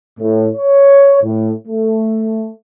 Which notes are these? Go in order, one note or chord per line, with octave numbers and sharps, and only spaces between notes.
A2
C#5
A2
A3